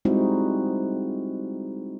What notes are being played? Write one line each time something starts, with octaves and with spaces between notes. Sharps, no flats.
G3 G#3 C4 D#4 E4 F#4